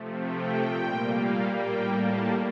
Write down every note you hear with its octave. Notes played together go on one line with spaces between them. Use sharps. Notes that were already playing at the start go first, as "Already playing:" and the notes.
Already playing: C3 F3 A3
G5
A#2 G3 A#3
F5
A2 G3 A#3 G5
A5